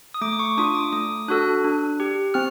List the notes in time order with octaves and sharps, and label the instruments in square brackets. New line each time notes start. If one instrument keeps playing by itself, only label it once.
[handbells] D#6
A3 D6
C#6
D4 F4 D#6
D6
A3 D#6
D4 F#4 A4 F#6
D4
G4
C4 F6